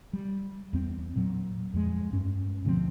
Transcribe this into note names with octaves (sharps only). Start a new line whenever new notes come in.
G3
E2 C4
A#2 F#3
F2 G#3
G2 C#4
D2 B2 F3 C4